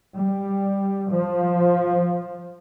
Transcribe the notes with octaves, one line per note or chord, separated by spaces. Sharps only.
G3
F3